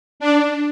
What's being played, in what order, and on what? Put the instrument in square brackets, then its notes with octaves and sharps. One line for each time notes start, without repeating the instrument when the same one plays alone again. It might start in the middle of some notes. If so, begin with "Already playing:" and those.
[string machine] D4